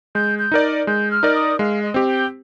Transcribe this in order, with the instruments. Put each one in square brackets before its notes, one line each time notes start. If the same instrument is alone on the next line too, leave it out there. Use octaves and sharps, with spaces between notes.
[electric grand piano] G#3 [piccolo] G6
[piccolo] G6
[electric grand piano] D#4 A#4 D5
[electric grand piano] G#3 [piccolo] G6
[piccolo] F6
[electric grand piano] D#4 A#4 D5
[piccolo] D#6
[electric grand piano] G#3 [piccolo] F5
[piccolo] D#5
[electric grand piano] C4 G4
[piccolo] G5